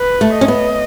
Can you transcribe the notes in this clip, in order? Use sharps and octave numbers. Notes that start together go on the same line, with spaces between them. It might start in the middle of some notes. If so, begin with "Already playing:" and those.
Already playing: B4
A3
D#5
C#4
B3